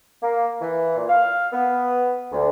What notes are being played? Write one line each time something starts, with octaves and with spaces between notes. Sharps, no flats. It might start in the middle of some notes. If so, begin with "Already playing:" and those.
A#3
E3
A#2
F5
B3
D2